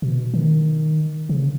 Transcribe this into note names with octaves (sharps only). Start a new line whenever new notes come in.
B2
D#3
C#3